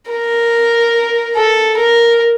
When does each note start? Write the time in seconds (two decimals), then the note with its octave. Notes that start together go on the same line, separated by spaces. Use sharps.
0.11 A#4
1.36 A4
1.77 A#4